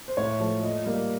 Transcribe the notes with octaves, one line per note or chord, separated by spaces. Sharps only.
C5
A2 C#5
F3 A3
A#2 D#5
G3 A#3